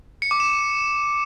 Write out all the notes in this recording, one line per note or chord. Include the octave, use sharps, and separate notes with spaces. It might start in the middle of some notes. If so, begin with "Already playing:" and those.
C#7
D6
E7